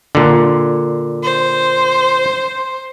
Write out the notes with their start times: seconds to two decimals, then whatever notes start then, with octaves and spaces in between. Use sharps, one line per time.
0.15 A#2 D3
1.23 C5